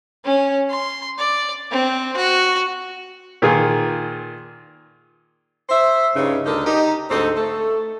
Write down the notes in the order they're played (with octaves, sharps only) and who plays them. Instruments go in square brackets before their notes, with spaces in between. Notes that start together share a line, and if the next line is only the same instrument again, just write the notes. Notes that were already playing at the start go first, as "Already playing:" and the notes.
[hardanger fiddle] C#4
C6
D5
C4
F#4
[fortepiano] A#2 D#3 F4 G#4
[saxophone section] C5 E5
G2 C#3 D#4
D2 D3 D#4 A4 A#4 D#5
D#4 G4
D2 G#2 C4 D#4 A4
A3 A4